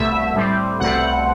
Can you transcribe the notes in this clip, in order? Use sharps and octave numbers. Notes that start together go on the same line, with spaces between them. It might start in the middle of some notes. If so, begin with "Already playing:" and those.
Already playing: C2 B2 A3 E5
A2 G3 C4
C2 B2 A3 C4 F#5